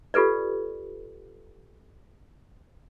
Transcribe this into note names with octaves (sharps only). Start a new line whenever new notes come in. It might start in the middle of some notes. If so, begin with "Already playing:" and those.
F4 G4 A4 B4 D5